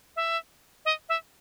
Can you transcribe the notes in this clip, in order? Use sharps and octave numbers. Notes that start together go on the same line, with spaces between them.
E5
D#5
E5